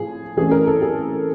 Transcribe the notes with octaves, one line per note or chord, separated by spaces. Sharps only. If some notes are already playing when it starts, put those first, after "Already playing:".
Already playing: A2 F3 G#4
E3 A3 C#4 G#4
A#4
A4
G#4